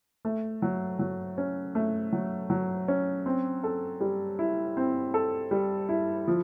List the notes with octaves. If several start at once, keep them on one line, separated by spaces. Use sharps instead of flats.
A3
F#3
F#3
C#4
A3
F#3
F#3
C#4
C4
A4
G3
E4
C4
A4
G3
E4
F3